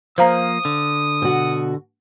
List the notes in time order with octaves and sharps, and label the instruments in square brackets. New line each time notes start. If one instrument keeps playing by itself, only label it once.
[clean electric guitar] F3 A#3 [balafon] C5 F5 A#5 [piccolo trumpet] D#6
[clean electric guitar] D3
[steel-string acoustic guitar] B2 F#4